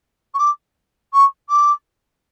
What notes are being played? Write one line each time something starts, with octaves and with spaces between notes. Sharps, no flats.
C#6
D6
C#6
D6